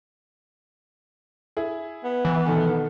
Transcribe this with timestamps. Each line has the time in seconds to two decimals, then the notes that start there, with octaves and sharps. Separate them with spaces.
1.57 E4 G#4
2.04 B3
2.25 E3
2.46 B2 D#3 A4